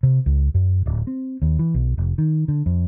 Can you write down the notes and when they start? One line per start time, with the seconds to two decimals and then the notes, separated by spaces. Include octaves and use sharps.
0.03 C3
0.26 C#2
0.54 F#2
0.86 D1
1.07 C4
1.42 D#2
1.59 E3
1.74 B1
1.98 F1
2.18 D#3
2.48 D3
2.66 F2